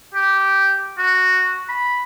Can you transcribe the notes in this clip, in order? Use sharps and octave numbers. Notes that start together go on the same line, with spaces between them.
G4
F#4
B5